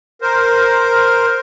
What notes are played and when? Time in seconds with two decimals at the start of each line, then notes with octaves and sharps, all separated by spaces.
0.21 A#4 C5